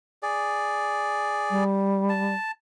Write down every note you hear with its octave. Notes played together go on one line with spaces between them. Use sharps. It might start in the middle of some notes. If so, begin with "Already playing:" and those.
G#4 D5
G3
A5